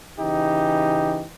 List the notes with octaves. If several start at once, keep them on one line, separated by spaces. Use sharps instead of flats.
C#3 E3 D#4 G4